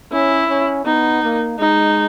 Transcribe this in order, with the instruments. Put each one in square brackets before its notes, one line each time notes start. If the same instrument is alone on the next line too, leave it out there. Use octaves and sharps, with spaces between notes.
[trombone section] C#4 [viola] E4
[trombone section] C#4
[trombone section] B3 [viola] D#4
[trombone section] A#3
[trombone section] G#3 [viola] D#4